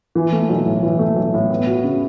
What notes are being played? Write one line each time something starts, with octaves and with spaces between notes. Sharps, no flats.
E3
A3
B1
A2
E3
A3
B1
A2
B3
F#4
C#3